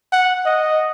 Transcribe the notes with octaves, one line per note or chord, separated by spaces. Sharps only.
F#5
D#5